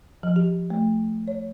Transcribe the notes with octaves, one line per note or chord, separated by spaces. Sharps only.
F3
G4
A3
C#5